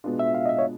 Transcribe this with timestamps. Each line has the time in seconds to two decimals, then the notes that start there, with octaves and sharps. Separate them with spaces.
0.04 B2 G#3 B3 D4 F4
0.19 E5
0.35 F5
0.46 D#5
0.49 E5
0.59 C#5